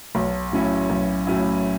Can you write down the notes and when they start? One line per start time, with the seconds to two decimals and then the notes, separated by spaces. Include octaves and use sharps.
0.15 B1
0.52 A2 F#3 C#4 E4
0.90 B1
1.27 A2 F#3 C#4 E4